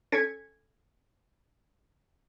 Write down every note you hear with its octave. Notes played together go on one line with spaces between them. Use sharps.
C#4 A4 G#6 B6 C#7